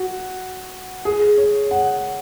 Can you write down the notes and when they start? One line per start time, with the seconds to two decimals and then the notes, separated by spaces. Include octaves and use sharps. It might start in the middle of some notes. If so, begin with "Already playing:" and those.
Already playing: F#4
1.05 G#4
1.38 C#5
1.71 F#5